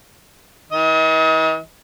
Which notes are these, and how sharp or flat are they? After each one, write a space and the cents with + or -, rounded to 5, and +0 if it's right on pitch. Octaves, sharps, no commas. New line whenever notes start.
E3 -45 D#5 +40